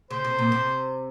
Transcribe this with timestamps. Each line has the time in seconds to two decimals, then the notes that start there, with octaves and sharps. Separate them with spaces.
0.11 C#3 C5
0.25 C3
0.39 A#2
0.52 C3